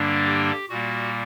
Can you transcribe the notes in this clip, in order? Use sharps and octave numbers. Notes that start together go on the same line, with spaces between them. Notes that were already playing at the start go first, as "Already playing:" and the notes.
Already playing: G2 D3 G3 A#3 D4
G4
A#2 G3 A#3 F#4